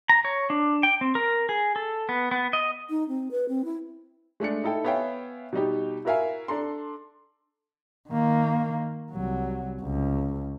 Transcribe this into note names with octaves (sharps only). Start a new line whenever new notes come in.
A#5
C#5
D4
G5
C4
A#4
G#4
A4
B3
B3
D#5
D#4
C4
B4
C4
E4
G#3 A3 D4 C#7
D#4 E4 A4 G5
B3 C#5 E5 F5 G5 G#5
B2 G3 D#4 G4
E4 F#4 A#4 E5 F5 G#5
D4 A4 A#5 C6
D#3 A#3
C2 F#3
C#2